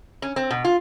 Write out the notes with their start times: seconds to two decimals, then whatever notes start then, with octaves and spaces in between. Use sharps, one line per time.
0.22 C#4
0.36 C4
0.51 B2
0.64 F4